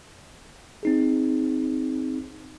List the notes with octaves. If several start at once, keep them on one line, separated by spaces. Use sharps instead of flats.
C4 D#4 G#4